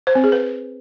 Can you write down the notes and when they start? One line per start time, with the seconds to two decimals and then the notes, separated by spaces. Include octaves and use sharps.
0.07 C5
0.15 C4
0.24 G#4
0.32 B4